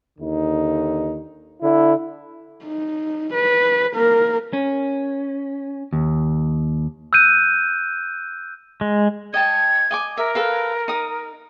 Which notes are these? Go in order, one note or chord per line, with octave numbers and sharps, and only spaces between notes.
D#2 D3 D#4
D3 E4
D#4
B4
A#3 A#4
C#4
D#2
E6 F#6 G6 D#7
G#3
D#5 G5 A5 G#6
D#5 G#5 D6
A#4 E5
A4 B4 F5
D#4 D#6